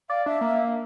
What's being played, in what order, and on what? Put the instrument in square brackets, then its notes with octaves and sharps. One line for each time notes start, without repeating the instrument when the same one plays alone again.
[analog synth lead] D5 [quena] F5
[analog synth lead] D4 [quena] E5
[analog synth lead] A#3